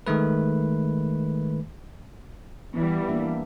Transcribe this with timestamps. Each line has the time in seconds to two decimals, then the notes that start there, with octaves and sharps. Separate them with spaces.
0.07 D#3 G#3 A3 B4
2.74 E3 G3 B3
3.09 A#3 D4 E5